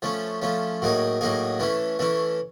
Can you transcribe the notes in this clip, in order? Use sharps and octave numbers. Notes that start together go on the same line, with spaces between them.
F3 A3 C#4
F3 A3 C#4
A2 F#3 A#3 D#4 G#4
A2 F#3 A#3 D#4 G#4
E3 A3 C#4 E4
E3 A3 C#4 E4